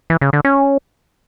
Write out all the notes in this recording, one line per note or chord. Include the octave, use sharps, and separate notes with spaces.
E3
C#3
D3
C#4